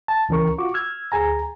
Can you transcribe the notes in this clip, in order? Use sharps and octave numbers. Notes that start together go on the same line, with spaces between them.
A5
C#2 E3 C#4 A#4 C#6
F4 F#4 C#6 D6
E6 F6 G#6
D2 G#4 G#5 A#5